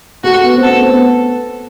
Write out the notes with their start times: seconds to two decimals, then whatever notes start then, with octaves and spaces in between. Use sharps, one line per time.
0.24 A3 F#4
0.44 B3
0.56 C4
0.63 A4
0.69 B3
0.81 C4
0.94 B3